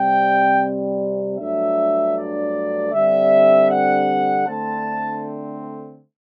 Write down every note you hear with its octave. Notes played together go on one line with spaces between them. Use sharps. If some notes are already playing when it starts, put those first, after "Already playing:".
Already playing: C3 G3 C4 G5
G2 F#3 A3 D4 E5
D5
D3 G3 C4 E5
F#5
D3 A3 C4 A5